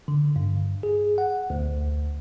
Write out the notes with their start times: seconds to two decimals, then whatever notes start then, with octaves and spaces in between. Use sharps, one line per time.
0.08 D3
0.36 G2
0.83 G#4
1.18 F#5
1.50 D2